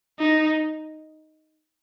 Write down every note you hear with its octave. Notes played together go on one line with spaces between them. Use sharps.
D#4